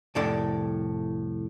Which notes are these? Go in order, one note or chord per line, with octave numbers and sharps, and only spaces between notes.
C2 F2 A2 A4 D5